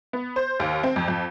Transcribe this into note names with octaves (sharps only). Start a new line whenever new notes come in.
B3
C5
D#2
C4
F2
F2